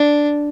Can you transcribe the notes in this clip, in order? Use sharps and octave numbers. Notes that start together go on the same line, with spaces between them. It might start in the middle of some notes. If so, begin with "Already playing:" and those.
Already playing: D4